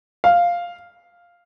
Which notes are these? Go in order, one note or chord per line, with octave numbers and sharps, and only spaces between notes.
F5